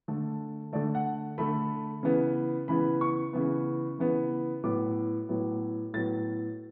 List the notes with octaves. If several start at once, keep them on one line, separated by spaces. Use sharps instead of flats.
D3 A3
D3 A3 D5
F#5
D3 A3 B5
C#3 E3 B3
C#3 E3 B3 B5
C#6
C#3 E3 B3
C#3 E3 B3
A2 F#3 B3 D6
A2 F#3 B3
A2 F#3 B3 A6